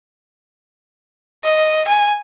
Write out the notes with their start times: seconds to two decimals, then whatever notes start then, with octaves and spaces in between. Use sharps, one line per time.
1.44 D#5
1.88 G#5